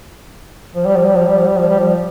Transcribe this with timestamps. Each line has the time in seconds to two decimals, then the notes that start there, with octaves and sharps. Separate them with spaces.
0.75 F3
0.85 G3
0.96 F3
1.07 G3
1.17 F3
1.27 G3
1.38 F3
1.47 G3
1.58 F3
1.69 G3
1.79 F3